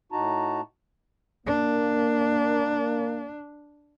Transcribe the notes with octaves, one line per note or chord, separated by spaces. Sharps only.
A2 D#4 F#4 A5 A#5
A#3 D4